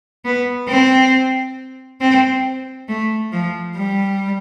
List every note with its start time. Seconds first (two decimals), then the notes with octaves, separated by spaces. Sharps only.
0.25 B3
0.68 C4
2.01 C4
2.88 A3
3.32 F3
3.76 G3